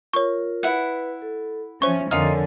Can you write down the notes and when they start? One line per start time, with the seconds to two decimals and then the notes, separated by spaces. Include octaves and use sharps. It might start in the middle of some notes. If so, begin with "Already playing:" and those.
0.13 F4 A#4 C#5 C#6
0.63 E4 B4 F#5
1.22 A4
1.82 F3 C#4 C5 E5 C#6
2.11 F2 D3 D#4 F4 A#4 C#5 G#5 F6